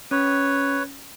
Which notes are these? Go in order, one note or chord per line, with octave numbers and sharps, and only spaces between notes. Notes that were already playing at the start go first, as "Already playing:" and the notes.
C#4 B4 C#5